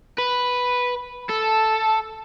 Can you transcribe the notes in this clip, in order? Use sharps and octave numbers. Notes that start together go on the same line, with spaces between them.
B4
A4